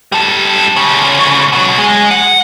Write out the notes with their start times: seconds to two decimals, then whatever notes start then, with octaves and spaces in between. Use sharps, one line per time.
0.12 G3 A4
0.76 D2 C#3
1.52 B2 F#3
1.78 G#3
2.11 F#5